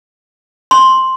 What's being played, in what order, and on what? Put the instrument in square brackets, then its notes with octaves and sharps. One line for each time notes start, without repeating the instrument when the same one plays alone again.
[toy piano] C6